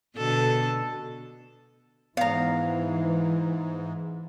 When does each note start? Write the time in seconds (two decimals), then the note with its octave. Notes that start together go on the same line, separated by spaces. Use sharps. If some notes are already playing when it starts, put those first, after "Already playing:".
0.17 B2 D3 A4
2.17 G#2 E3 B3 F5 A#5